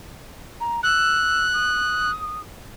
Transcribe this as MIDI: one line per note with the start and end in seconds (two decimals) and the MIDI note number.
0.60 0.80 82
0.83 1.47 88
0.83 2.11 90
1.53 2.39 87